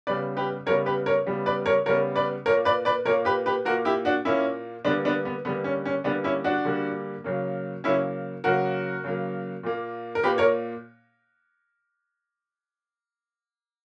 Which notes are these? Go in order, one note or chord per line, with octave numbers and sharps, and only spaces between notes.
C#3 G3 B3 B4 D5
G4 B4
C#3 G3 B3 A#4 C#5
G4 B4
A#4 C#5
C#3 G3 B3
B4 D5
A#4 C#5
C#3 G3 B3 A#4 C#5
B4 D5
A#2 A#3 A#4 C#5
B4 D5
B4 D5
A#2 A#3 A#4 C#5
G4 B4
G4 B4
A#2 A#3 F#4 A#4
E4 G4
D4 F#4
A#2 A#3 C#4 E4
D3 G3 A#3 B3 D4
B3 D4
B3
D3 G3 A#3 B3
C#4
C#4
D3 G3 A#3 B3 D4
C#4 E4
D4 F#4
D3 G3 A#3
C#3 F#3 A#3
C#3 F#3 A#3 C#4 E4
C#3 F#3 A#3 F#4 A#4
C#3 F#3 A#3
A#2 A#3
A#4
A#2 A#3 G4 B4
A#4 C#5